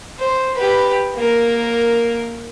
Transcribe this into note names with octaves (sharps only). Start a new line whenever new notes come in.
C5
G4 B4
A#3 A#4